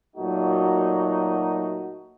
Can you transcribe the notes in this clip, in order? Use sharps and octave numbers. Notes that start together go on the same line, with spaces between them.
A#2 F#3 A3 D#4 F#4